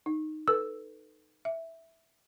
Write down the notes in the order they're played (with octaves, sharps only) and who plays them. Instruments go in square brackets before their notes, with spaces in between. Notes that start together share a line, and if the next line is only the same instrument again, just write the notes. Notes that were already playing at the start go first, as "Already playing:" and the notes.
[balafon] D#4
[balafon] A4 B4 [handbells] E6
[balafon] E5